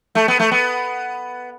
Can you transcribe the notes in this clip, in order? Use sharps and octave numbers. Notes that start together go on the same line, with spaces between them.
A3
B3
A3
B3